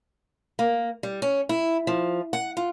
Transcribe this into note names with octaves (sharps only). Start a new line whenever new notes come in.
A#3
G3
C#4
E4
F3
F#5
F4